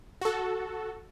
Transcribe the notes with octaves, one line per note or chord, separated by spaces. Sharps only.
F#4 A4